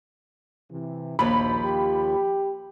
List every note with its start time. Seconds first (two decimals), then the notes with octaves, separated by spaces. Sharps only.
0.71 C3 E3
1.19 A#1 D#2 F3 B5
1.64 G4